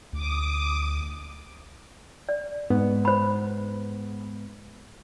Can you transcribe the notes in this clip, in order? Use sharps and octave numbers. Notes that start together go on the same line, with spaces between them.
D2 D6 D#6
D5
G#2 B3
C5 B5